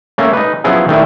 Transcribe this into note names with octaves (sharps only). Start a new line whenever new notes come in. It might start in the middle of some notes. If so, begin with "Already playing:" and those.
A3 A#3 C#4
D#4 B4
F3 F#3 B3 C#4 E4 G#4
D#3 A3 D4 E4